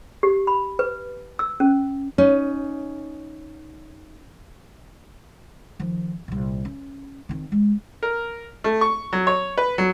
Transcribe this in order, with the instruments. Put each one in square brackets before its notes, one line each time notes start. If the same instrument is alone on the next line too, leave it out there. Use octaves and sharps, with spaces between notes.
[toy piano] G4
B5
B4
E6
C#4
[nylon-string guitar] C#4 D#4
[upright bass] D#3 F3
C2 A#2
C#4
D#3 C4
G#3
[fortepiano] A#4
A3
C#6
F#3
C#5
B4
F#3